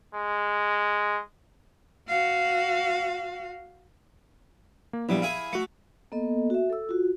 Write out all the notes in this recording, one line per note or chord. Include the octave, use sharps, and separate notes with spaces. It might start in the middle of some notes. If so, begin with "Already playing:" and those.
G#3
F#4 F5
A#3
A#1 G3 B3 E4
E4 G#4 F5 G#5
A3 F#4 C#7
A#3 B3 A4 D#5
F#4 E5
A4 E6
F4 F#4